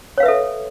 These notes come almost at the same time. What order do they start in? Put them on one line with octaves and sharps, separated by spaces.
C#5 F5 B4 E5 A4